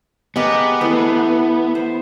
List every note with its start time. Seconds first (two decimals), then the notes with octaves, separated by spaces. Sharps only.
0.36 G#3 B3 G4 A#4
0.81 E3 A3 C5
1.75 C5